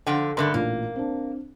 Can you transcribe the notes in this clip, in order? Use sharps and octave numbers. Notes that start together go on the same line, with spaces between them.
D3 F3 F#5 G5
G2 D3 A3 A#4 C6
A1 A#2 A#3
C4 D4